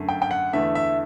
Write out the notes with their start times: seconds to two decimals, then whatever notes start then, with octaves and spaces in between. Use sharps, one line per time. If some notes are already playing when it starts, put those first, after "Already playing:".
Already playing: F#2 D3 A3
0.09 G5
0.22 G5
0.31 F#5
0.53 E2 D3 A3 E5
0.75 E5